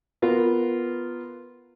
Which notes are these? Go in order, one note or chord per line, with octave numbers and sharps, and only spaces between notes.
B3 F4 A#4 B4